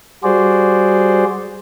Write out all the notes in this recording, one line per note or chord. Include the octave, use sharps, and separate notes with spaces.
G3 F#4 G#4 C5 D5